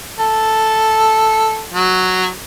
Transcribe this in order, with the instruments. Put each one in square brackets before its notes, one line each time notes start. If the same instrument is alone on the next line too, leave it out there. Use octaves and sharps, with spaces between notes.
[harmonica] A4
F#3